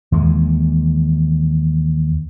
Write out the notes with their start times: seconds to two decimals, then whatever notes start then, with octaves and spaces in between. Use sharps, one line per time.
0.12 D#2 E3 G#3